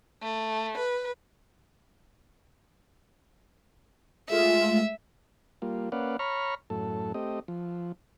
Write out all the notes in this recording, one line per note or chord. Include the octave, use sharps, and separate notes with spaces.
A3
B4
G#3 A3 F4 E5
G3 A#3 F4
A#3 C#4 B4 D5 F5 F#5
C#5 A#5 B5 C#6 F6
F#2 A2 A4
A3 C4 G4 D#5
F3